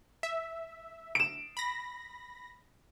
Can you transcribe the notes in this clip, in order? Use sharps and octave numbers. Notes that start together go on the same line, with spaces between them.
E5
D7 E7
B5 A#6